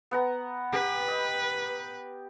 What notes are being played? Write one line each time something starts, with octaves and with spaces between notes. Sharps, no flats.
B3 F#5 A#5
G4 B4
D#5